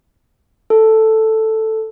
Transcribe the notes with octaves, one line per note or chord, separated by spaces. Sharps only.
A4